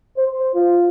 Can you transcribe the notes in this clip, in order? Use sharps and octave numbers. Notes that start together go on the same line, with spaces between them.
C5
F4